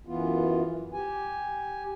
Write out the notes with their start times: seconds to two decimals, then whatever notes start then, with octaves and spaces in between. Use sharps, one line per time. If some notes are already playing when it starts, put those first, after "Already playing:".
0.07 F#2 E3 B3 F4
0.93 G4 G#5